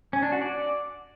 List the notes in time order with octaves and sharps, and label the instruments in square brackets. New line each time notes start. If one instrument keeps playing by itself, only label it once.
[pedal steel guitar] C#4
D4
F#4
D5